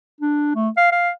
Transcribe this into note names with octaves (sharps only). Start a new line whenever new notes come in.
D4
A3
F5
F5